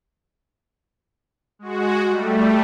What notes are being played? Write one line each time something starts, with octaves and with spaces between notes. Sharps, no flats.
G#3 F#4
G3 A3